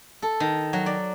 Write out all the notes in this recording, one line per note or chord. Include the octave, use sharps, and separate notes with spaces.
A4
D#3
F#3
D5